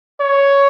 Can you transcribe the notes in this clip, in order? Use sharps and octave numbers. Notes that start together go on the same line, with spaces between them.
C#5